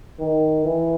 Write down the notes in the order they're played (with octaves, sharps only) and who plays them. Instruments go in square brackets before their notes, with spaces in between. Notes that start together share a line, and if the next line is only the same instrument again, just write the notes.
[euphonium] D#3
E3